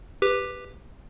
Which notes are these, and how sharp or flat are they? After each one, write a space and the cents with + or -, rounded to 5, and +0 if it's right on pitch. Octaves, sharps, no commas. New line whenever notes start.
G4 +10 B4 +0